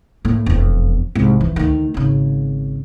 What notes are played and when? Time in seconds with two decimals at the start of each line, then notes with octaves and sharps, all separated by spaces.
0.25 A2 A#3
0.46 E1 F2
1.15 C2 G#2
1.41 E3
1.56 D2 D#3
1.94 G#1 C#3